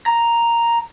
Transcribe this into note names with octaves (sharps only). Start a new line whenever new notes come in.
A#5